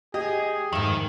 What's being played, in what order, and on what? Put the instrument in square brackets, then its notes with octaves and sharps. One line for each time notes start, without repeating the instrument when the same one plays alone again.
[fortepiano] G4 D#5 [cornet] G#4
[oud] F2 G#2 [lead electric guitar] D#3 [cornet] E5